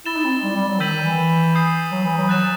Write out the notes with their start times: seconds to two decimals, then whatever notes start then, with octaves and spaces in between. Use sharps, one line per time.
0.06 E4 A6 E7 G7
0.16 D#4
0.24 C4
0.43 G3
0.56 G3
0.68 F#3
0.80 D#3 E6 G6 B6 D#7 F#7
0.99 E3
1.55 D#6 G6 C7
1.92 F#3
2.04 E3
2.18 F#3
2.29 F#3 F#6 A6 E7